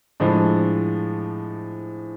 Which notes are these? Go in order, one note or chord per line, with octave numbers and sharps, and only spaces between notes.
A2 F3 G#3 D4